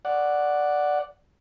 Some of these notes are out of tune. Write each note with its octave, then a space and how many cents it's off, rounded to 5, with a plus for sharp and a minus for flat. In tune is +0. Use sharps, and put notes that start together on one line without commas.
D5 +0 F#5 +0